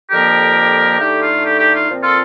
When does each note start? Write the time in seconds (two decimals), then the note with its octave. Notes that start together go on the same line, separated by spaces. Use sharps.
0.11 F2 D3 F3 A#3 G4 A#4
0.99 D3 A3 D#4 G4
1.22 F4
1.45 G4
1.59 G4
1.74 F4
1.89 A#2 F3 C4
2.03 F4 A4